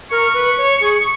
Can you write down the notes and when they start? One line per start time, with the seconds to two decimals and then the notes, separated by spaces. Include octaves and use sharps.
0.11 A#4 C#6
0.34 B4
0.58 C#5
0.81 G#4